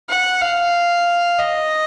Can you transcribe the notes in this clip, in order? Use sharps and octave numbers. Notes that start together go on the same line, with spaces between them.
F#5
F5
D#5